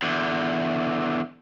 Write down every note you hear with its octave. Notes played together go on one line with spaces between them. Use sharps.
E2 D3